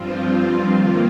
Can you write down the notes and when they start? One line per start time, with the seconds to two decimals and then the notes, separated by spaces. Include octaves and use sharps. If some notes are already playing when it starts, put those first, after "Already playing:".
Already playing: G2 F3 C4 F4
0.76 D#3 A#3 F4